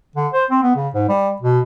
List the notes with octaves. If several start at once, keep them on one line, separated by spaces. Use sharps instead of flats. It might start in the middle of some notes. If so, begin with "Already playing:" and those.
D3
C5
C4
B3
C#3
G#2
G3
B2